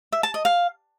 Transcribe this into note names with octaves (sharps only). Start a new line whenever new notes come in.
E5
A5
D#5
F5